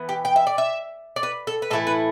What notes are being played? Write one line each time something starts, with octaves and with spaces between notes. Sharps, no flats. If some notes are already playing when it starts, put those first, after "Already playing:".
Already playing: E3 B3
G4
G5
E5
D5
E5
D5
B4
A4
B4
A2 E3 A3 E4 A4
B4